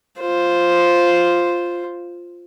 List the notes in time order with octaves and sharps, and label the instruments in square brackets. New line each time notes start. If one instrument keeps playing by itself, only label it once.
[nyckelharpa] F4 C5